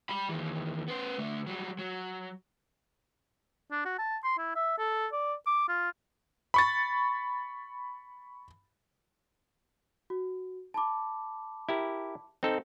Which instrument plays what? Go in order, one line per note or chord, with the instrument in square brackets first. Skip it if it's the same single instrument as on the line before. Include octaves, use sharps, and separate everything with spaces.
[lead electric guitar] G3 B5
D#2 E3
B3 C5
D3 A3
F#3 G3
F#3
[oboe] D4
F#4
A5
C6
E4
E5
A4
D5
D6
F4
[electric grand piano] B5 C#6 A6
[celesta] F#4
A5 B5 D6
[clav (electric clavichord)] E4 G4 A#4
C4 D#4 A4